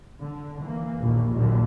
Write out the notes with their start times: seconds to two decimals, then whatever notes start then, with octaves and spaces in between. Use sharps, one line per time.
0.22 D3
0.62 E3 A#3
1.01 A#1 D#2 B2
1.35 A#1 D#2 A#2 D3 F#3